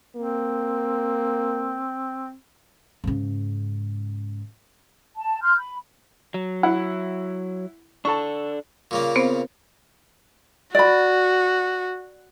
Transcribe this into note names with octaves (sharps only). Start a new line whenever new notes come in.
A#3 C4
G#2 C#3
A5
C6 F6 G6
B5
F#3
E4 F#5
D4 A4 A5 C#6
A#2 C#3 A#3
B3 C4 C5
F#4 D5 B5